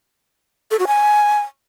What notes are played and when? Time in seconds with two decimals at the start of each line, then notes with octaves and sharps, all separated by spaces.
0.71 A4
0.79 F#4
0.87 G#5